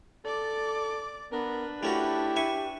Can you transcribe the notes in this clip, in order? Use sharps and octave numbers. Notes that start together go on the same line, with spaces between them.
A4 D5 D6
B3 D4 A#4 B4
A3 C#4 E4 F#4 G4
E5 G#5 C#6